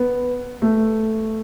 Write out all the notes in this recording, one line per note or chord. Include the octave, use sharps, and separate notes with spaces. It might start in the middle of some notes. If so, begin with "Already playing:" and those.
Already playing: B3
A3